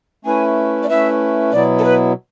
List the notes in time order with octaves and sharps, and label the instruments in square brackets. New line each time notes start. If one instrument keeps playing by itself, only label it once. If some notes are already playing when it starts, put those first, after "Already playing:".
[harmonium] A3 C#4 E4 B4 [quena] G#5
[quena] D5
[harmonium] A3 C#4 E4 B4 [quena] E5
[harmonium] B2 F#3 B3 E4 [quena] D5
[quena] A4
B4